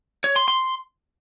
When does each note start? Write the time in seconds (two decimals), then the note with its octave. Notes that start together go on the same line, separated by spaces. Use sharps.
0.24 C#5
0.36 C6
0.48 C6